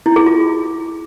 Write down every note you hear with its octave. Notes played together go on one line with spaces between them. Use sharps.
E4
G#4
F4